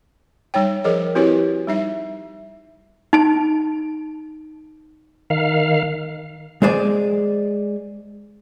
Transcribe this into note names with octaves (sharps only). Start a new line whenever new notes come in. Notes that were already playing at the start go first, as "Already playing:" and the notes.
G3 D#4 C#5 G5
F3 G#4 A#4 C5 C#5 D#5
C4 E4 F#4 G4 B4 C#5
G3 D#4 E5
D#4 A5
D#3 F5
G#3 G#4 C5 D5 G#5